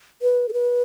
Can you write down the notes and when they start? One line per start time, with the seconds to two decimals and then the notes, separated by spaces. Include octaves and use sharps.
0.22 B4
0.49 A4
0.53 B4